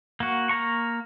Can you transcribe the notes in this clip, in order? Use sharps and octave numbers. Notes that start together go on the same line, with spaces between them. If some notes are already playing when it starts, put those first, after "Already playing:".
A#3 F#4
A#3 A#5 C#6